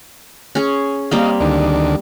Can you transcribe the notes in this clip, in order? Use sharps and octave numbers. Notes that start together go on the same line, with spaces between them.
C#4 G#4
G3 A#3 C4 D#5 F5
D2 D#3 D4